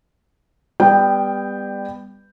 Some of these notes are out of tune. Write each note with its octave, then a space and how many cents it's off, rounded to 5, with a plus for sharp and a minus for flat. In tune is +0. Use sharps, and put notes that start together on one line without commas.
G3 +25 B3 +10 G5 +0